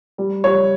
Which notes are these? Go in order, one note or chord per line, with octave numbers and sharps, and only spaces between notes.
G3
G3 C#5